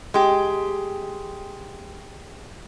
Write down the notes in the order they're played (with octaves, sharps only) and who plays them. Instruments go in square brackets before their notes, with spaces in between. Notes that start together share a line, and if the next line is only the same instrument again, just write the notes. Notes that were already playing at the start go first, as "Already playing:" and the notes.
[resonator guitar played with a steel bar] G#3 G4